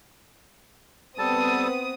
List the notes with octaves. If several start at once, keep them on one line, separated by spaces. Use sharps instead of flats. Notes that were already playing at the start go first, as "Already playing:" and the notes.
G3 B3 C4 A4 A5 D#6